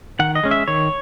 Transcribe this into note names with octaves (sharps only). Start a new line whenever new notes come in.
D#3 F#5
D#5
G#3 C#4
E5
D#3 C#5